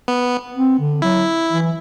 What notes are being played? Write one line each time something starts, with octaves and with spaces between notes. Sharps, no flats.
B3
C4
D3
F#3 E4
E3